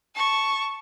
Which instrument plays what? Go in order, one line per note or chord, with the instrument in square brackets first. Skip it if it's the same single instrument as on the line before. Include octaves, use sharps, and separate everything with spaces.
[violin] A5 C#6